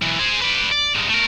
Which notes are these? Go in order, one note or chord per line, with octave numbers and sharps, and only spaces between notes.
B1 E3
G#4 C5
B4 D5
D5
G2 G#3
A3 A#4